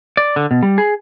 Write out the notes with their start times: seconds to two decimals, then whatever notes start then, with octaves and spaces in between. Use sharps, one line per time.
0.17 D5
0.36 D3
0.51 B2
0.63 G3
0.78 G#4